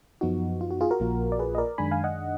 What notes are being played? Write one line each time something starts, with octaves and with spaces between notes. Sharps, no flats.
F#2 F3 B3 D#4 F#4
F4
F#4
F4 G#4
F#4 A#4
A#1 A#2 F3 A#3 F4
D5
G#4 B4
D#5
A#4 D5
F#2 D#3 G#3 D4 G#5 B5
F5 G#5
D#5 F#5